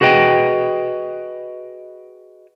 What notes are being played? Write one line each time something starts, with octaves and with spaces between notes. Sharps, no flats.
F#4 G#4 B4 D#5 G5